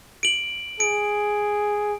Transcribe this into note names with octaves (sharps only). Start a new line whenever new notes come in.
D7 F#7
G#4 D7